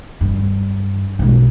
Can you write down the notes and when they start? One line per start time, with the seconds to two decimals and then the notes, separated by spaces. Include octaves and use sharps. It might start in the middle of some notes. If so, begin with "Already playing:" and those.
0.21 G2
1.19 B1 G#3